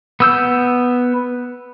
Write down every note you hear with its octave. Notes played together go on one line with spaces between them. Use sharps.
B3 E6 G6